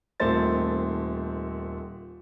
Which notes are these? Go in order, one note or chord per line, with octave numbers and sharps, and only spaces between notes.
D#1 D#3 A3 C4 C5 A6